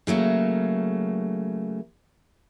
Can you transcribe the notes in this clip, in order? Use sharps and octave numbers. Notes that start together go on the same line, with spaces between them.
C#3 F#3 A3 A#3